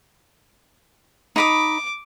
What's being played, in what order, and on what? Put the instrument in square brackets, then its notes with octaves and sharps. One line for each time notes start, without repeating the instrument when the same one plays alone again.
[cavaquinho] D#4 B5 D#6 [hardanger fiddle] D6